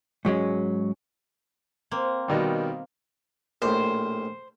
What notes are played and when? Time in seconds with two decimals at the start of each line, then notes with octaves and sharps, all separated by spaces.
0.25 G#2 F#3 G#3 C#4
1.91 A#3 C4
2.28 B2 D#3 G3
3.62 A#1 A2 C5